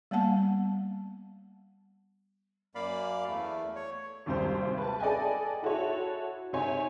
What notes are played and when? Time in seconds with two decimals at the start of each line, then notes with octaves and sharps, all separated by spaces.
0.11 G3 A#3 B3 F#5 A5
2.75 F#2 A#3 D5 F5 B5
3.29 E2 A3
3.76 C#5
4.26 G#1 D#2 C3 G3 C5
4.78 B4 A5
5.00 A4 D5 D#5 G5 G#5
5.63 E4 F#4 A4 C#5
6.53 C3 D#4 C#5 G#5